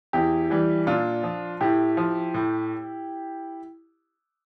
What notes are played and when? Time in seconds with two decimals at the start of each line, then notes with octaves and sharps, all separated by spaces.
0.13 E2 E4 G4
0.50 E3 G3
0.87 A#2 D4 F4
1.23 F3
1.61 A2 E4 G4
1.97 F3
2.34 A2